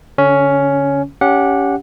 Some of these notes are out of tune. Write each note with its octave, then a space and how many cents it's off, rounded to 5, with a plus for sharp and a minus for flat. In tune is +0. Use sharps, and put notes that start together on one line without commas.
D3 -35 C#4 +10
C#4 +25 G4 +0 F#5 -20